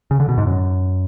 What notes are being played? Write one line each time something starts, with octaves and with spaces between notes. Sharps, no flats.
C#3
D3
B2
G#2
F#2